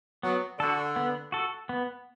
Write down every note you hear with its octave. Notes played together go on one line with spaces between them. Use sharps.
F#3 B3
D3 F#4 A4
B3
F#4 A4
B3